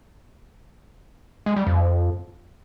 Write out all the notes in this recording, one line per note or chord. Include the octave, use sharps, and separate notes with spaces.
G#3
G3
F2